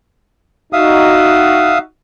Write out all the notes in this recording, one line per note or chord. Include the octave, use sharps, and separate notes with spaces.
D#4 F#4 E5 F5 D#6